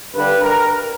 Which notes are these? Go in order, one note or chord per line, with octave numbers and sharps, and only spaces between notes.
G2 D3 G3 B4
A#4